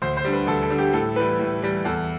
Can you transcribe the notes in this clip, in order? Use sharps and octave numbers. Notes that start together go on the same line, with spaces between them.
D2 C5
C5
D3 G3
B4
D2 A4
A4
D3 G3
G4
A2 A4
E3 G3 B4
A2
E3 G3
E2 A4